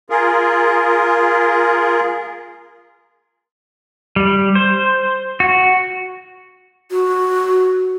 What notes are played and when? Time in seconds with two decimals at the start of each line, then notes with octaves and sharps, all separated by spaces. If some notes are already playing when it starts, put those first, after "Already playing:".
0.10 F4 G#4 A#4
4.16 G3
4.55 C5
5.40 F#4
6.91 F#4